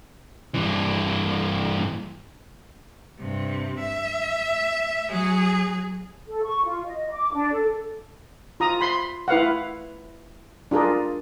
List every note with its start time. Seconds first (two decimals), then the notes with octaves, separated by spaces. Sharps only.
0.54 G2 E3
3.19 G2 C3
3.80 E5
5.09 F#3 G#4
6.28 A4
6.45 C#6
6.65 F4
6.86 D#5
7.11 D6
7.33 D4
7.52 A4
8.60 F4 A#5 D#6
8.81 B5 C6
9.28 E4 B4 F5 F#5
10.71 D4 F4 G#4 A#4